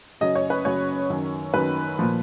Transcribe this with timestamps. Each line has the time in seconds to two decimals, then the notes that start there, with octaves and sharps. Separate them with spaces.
0.20 F#2 C#3 F#3 D#5
0.35 C#5
0.50 B4
0.65 F#2 C#3 F#3 C#5
1.10 F#2 D#3 F#3
1.53 F#2 D#3 F#3 B4
1.99 A#2 F3